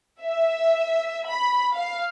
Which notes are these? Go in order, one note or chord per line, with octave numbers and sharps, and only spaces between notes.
E5
B5
F5